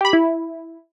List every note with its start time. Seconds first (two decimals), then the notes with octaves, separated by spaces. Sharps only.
0.01 G4 B5
0.13 E4